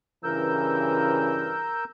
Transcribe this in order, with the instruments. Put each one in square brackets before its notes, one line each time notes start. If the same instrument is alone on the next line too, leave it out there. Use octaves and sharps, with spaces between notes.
[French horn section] G2 C#3 E3 [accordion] A#4 E6 G6